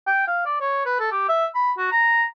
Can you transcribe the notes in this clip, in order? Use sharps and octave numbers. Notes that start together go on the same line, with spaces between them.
G5
F5
D5
C#5
B4
A4
G4
E5
B5
F#4
A#5